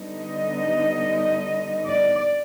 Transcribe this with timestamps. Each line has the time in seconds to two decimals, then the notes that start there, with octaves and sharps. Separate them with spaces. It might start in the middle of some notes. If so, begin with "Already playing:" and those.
Already playing: D3 G3 B3 D#4
0.19 D#5
1.86 D5